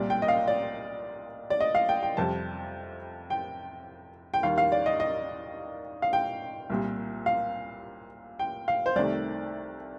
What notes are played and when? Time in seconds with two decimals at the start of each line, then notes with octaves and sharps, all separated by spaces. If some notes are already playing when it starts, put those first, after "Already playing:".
Already playing: C2 A#2 G3 D5
0.10 G5
0.22 D#5
0.28 F5
0.48 D5
1.50 D5
1.60 D#5
1.75 F5
1.89 G5
2.03 G5
2.17 F2 C3 G3 A5
3.30 G5
4.34 G5
4.43 D#2 D#3 G3 F5
4.58 F5
4.72 D5
4.86 D#5
5.00 D#5
6.02 F5
6.13 G5
6.70 C2 A#2 G3
7.26 F5
8.39 G5
8.68 F5
8.86 C5
8.96 C2 C3 D#3 A3 D5